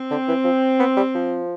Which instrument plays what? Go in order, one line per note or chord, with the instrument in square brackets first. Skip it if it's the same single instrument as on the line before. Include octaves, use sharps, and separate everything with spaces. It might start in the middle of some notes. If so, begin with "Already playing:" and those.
Already playing: [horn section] C4
[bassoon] D3
E3
F3
B3
G3
F3